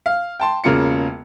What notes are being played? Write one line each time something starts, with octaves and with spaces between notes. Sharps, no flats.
F5
G5 A5 C6
E1 C#3 A#3 F4 C#7